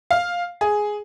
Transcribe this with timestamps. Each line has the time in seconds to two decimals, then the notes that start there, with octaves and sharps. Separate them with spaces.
0.11 F5
0.61 G#4